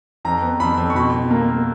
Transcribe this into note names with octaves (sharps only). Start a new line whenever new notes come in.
F2 A#5
B3
F2 B5
F2
C#6
B2 B5
B2
A#3 A#5
A#3